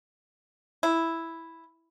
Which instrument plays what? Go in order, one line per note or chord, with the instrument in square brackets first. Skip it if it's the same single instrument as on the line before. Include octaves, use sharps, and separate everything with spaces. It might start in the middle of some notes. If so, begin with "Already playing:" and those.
[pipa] E4